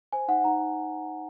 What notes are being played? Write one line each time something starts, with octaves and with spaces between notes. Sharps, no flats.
C5 G#5
D#4 F#5
D#4 A#5